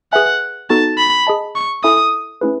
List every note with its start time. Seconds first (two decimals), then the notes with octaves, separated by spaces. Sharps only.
0.12 G#4 B4 E5 F#5 G#5
0.70 B3 D#4 F#4 A4 A5
0.98 B5
1.27 G#4 D#5 A5
1.56 C#6
1.83 E4 A4 E5 G#5 D#6
2.41 A3 C#4 E4 G#4 B4